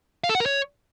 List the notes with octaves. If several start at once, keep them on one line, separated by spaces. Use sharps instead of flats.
F5
A4
F#5
A#4
C#5